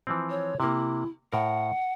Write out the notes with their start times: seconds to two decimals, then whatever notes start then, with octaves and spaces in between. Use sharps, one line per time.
0.07 E3 F3 C4
0.30 C#5
0.60 C3 A#3 E4
1.32 A2 A#4 F#5